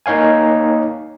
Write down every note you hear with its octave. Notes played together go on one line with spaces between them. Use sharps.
A#3 D#4 C#5 F5 G#5